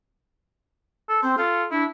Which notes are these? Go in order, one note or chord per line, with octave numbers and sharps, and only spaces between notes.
A4
C4 C5
F4 A4
D4 E4